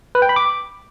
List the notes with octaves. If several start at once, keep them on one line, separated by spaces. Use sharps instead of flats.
B4
G5
B5
D6